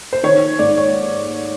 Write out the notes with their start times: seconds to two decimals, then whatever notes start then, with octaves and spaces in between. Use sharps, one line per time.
0.13 C5
0.23 D#3 C#5
0.59 G#2 D5
0.78 C#5